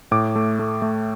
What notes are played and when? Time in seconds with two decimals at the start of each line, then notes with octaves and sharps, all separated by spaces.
0.11 A2 D6
0.36 A3
0.59 A3
0.82 A3